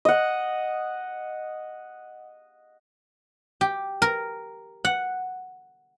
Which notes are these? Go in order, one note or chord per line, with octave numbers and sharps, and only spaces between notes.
D#5 F#5
G4
A#4
F#5